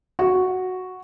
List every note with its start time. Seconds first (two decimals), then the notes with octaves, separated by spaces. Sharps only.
0.19 F#4